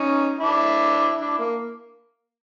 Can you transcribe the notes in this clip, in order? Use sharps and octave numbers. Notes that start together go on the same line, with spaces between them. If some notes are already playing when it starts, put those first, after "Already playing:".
Already playing: C#4 D#4
D4 E4
D4 E4
A#3